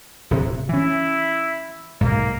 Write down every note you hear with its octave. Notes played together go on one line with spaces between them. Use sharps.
D1 C3
E3 C#4 E4
B1 G#2 A#3